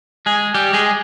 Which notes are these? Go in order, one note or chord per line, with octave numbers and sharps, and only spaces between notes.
G#3 G#4
G3 G4
G#3 G#4